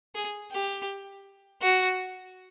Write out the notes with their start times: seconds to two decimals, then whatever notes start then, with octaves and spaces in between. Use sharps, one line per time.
0.15 G#4
0.52 G4
1.62 F#4